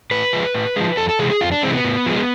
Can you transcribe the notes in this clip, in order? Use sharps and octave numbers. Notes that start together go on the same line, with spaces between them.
A2 B4
F3 G#3
A2
F3 G#3
F2 A4
A4
C3 E3 G#3 G#4
G#4
F2 F4
D4
C3 E3 G#3 C4
B3
A2
F3 G#3